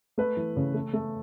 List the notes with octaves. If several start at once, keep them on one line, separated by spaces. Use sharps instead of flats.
A3 B4
E3
C#3
A3
A3